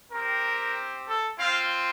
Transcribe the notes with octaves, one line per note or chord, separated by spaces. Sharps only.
C4 G4 A#4
A4
C4 F4 F5